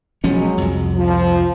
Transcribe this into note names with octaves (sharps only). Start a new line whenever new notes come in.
E1 F3 F#3 G#3 C#4
C2 F2
F3